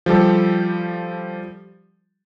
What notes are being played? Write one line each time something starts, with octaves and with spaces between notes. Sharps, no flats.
F3 G3 G4 A4